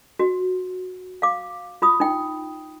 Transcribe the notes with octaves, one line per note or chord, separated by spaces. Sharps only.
F#4
F5 D6
F4 B5 D#6
D#4 G5